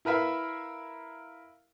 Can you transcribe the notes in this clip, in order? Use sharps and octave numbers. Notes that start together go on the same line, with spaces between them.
E4 A#4 B4 E5 F5